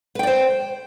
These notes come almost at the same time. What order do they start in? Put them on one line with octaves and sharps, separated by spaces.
B4 G5 D5 C5